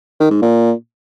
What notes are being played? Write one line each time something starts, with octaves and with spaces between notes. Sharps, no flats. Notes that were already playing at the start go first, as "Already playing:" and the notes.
D#3
G#2
A#2